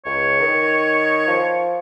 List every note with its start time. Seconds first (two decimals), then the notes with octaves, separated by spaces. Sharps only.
0.06 C#2 C#5
0.40 D#3
1.28 F3